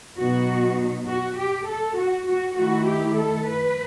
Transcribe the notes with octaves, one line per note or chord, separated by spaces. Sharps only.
B2 F#3 B3 D#4 F#4
F#4
G4
A4
F#4
F#4
D#3 A3 E4 F#4
G4
A4
B4